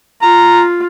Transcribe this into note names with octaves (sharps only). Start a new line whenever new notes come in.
F4 A#5